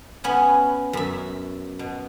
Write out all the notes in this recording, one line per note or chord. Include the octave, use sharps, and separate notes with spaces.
B3 C#4 G#5
F#2 E5
B2